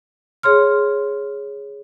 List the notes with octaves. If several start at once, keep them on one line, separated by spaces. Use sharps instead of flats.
G#4 C#5 C6 F6